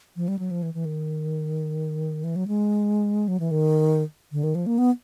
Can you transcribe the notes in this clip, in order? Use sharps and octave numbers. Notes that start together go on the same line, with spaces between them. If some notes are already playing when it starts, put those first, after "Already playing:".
F3
G3
F#3
F3
E3
E3
D#3
E3
F#3
G#3
F#3
E3
D#3
D3
D#3
F3
A#3
B3